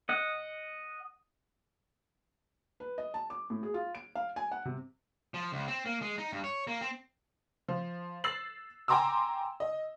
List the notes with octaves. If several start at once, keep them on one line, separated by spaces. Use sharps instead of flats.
D#5 F#5
B4
D#5
A5
D6
A2
G#4
F4
D7
F5
G#5
F#5
C3
F3
C#2
C4
A#3
G#3
D#4
G2
C#5
A#3
C4
F3
E6 A6 C7 F#7
G5 G#5 A#5 C6 D6 E6
D#5